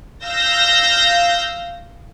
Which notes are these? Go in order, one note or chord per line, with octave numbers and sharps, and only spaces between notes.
F5 E6 G6 A#6